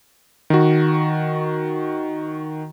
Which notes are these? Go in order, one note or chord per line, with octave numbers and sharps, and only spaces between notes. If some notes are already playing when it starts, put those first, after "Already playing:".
D#3 F#4